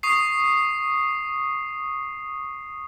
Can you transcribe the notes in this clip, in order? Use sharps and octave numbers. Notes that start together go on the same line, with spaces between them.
C#6 D#6 C7